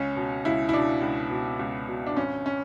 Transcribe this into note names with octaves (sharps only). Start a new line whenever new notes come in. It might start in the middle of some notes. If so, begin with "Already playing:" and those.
Already playing: C#2 C#4
B2
C#2 E4
E4
B2 D4
C#2
B2
C#2
B2
D4
G#1 C#4
C#4